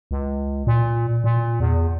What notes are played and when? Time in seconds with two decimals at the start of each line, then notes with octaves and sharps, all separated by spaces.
0.11 C#2
0.67 A#2
1.24 A#2
1.60 E2